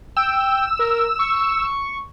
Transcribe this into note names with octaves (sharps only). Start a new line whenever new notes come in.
G5 E6
A#4
C#6